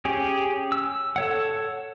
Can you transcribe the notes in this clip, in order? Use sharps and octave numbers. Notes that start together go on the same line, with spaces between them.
C#4 G4 G#4
E6
A4 C#5 F#5